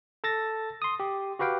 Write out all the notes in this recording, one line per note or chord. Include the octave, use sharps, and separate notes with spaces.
A4 A5 A6 A#6
C6 D#6
G4
F#4 G4 B4 F5 G5